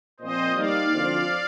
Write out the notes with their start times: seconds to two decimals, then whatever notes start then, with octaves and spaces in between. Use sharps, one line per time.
0.20 A#2 F3 C4 C5 D#5
0.55 G3 A#3 D#4 D5 F5
0.91 D3 F3 C4 F4 C5